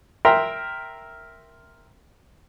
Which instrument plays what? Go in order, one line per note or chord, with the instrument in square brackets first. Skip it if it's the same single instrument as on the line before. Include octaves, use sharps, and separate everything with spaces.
[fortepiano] A#4 E5 G5 A#5 C6